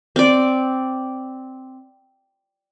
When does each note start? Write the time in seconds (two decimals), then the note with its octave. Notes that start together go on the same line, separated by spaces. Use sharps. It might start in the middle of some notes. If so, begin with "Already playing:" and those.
0.16 C4 D5